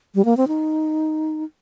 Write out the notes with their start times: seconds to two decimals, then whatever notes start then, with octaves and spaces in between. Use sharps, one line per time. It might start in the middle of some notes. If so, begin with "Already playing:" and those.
0.15 G3
0.25 A#3
0.37 C4
0.48 D#4